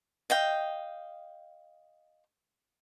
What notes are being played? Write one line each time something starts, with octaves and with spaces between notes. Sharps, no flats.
D#5 F5 G5